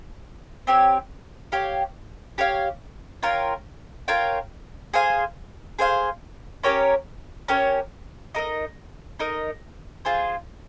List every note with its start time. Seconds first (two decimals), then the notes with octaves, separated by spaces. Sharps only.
0.67 C4 G4 C#5
1.52 G4 C#5 F5
2.38 G4 C#5 F5
3.23 F4 A#4 C#5 G5
4.08 F4 A#4 C#5 G5
4.94 G#4 C5 F5 G#5
5.79 G#4 C5 F5 G#5
6.64 C#4 G4 A#4 C#5
7.48 C#4 G4 A#4 C#5
8.35 D#4 A#4 D#5
9.19 D#4 A#4 D#5
10.05 F4 G#4 C5